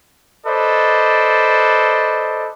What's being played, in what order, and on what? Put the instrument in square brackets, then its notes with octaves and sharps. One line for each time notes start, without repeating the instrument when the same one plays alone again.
[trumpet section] A4 B4 C5 D5 D#5